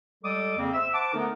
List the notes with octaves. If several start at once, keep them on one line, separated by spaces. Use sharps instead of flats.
G3 G#3 A4 D6 D#6
F2 C#3 A#3 C4
C5 E5 E6
C5 F#5 A5 D6
D3 A3 B3 D#4 A#4